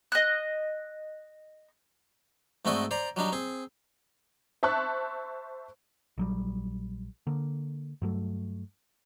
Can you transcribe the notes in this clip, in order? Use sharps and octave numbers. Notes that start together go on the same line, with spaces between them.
D#5 F#6
G#2 A3 C4 F#4 D5 D#5
C5 D5 A#5
F#3 G3 D4 D#4
C4 G#4
C5 E5 A5 C#6 F#6
A#1 F#3 G3
D3 A#3
G2 F#3 A3